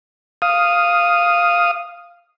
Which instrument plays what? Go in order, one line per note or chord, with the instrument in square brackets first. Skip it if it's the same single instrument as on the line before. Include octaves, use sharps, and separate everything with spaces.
[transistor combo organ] F5 D#6